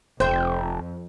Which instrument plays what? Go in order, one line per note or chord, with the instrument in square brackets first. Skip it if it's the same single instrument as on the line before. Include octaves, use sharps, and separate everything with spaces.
[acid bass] F1 [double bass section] F2 [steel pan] C5 [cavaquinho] E5 G5